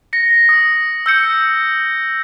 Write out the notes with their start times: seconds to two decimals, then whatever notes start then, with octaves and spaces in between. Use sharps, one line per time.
0.13 A#6 C#7
0.49 D#6
1.06 E6 G6 C#7